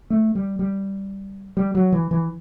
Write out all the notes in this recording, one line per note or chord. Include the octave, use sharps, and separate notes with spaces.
A3
G3
G3
G3
F#3
E3
E3